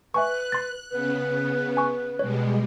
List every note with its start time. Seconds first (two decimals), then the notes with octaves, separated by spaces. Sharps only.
0.14 B4 E5 G#5 C#6 F#6
0.52 C6 A6
0.91 C#3 B3 B4
1.77 G#5 C#6
2.19 B2 G3 G#3 C#5